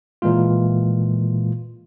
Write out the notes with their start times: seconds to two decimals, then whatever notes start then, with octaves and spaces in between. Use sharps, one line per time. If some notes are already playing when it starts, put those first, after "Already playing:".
0.22 A#2 E3 G#3 A#3 F4